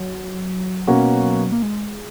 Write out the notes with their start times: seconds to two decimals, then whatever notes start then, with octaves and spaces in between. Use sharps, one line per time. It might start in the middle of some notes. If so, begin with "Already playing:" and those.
Already playing: F#3
0.87 B2 A#3 C#4 F#4
1.52 A#3
1.62 G#3